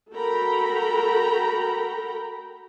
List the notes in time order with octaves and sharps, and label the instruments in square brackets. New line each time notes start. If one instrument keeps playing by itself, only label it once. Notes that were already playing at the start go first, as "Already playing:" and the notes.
[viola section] F#4 A4 A#4 G5 A#5 B5